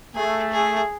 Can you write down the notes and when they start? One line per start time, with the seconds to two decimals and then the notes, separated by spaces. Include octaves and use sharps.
0.15 A3 G#4
0.52 G#4